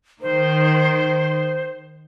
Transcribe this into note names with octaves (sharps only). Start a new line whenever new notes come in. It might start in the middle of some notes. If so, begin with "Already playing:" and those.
D#3 C5